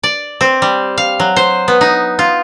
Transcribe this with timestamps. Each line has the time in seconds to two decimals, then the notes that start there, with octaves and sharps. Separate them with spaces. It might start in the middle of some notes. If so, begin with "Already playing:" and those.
0.03 D5
0.41 C4
0.62 G3
0.98 F5
1.20 F#3
1.36 C5
1.68 B3
1.81 D#4
2.19 F4